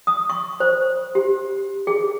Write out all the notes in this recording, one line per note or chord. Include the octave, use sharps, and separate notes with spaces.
D#6
C#6
C5
G4
G#4